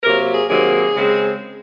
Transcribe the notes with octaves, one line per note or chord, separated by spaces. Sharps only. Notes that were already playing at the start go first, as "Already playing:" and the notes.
C3 F#3 A#3 A#4
G#4
C3 D#3 F#3 A#3 G#4
C#3 G#3 C4